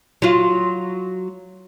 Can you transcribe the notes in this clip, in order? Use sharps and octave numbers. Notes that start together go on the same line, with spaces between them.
F#3 F4